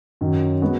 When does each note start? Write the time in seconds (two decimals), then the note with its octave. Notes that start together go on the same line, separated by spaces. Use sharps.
0.21 F#2 D#3 F#3
0.62 G#3 B3 F#4